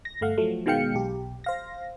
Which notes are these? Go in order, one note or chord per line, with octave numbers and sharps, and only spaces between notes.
A#6
G1 A3 F5 F#5
F3 F#3 A3
B2 D#3 G#3 F5 G5 C#7
B1 G4
C5 F5 A#6